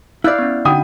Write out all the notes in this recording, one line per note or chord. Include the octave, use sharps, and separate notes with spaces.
E4 D5 F5 F#6 G6 A6
B3 C#4
D3 D#4 F#4 F#5 G5 D#6